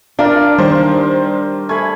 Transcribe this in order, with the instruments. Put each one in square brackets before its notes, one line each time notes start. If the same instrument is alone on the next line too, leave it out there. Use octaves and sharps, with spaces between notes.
[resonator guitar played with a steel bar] D4 [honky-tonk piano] F4 [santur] A#4 D5 G5
[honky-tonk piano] D#3 C5 [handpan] G3
[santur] A3 C5 B5 [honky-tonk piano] G#5 G#6